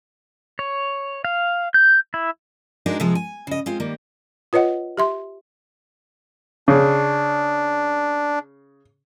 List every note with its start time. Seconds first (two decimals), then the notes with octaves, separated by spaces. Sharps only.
0.59 C#5
1.25 F5
1.74 G6
2.14 E4
2.86 G#3 D4 D#4 F#4 A#4
3.00 C3 F3 G#3 G#4
3.15 G#5
3.47 C#3 D#5
3.66 G#3 C4 F4
3.80 D#3 G3 A#3
4.53 F4 B4 C#5 D#5 F#5
4.97 G4 E5 C6
6.68 C#3 D4